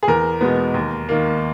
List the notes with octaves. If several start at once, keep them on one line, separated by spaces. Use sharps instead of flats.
G#4
E2 A#4
B2 G#3 B3
D#2
D#3 A#3